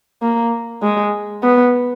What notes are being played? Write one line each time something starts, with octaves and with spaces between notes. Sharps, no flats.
A#3
G#3
B3